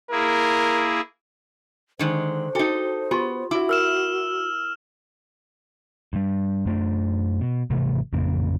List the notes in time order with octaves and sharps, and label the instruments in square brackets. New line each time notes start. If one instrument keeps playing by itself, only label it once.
[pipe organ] A#3 E4 G#4 [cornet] A#4
[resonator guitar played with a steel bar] D3 D#3 G#3 [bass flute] C5
[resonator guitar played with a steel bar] D#4 A4 [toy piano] F#4 G#4 G5
[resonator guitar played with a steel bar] B3 [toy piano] F4 G4 C6
[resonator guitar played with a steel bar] E4 [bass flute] F#4 [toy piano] E5 D6
[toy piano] A#4 [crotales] E6 F6 E7
[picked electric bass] G2 G3
F#2 A3 C#4 D4
B2
G#1 C3 E3 A3
A1 F2 C#3 A#3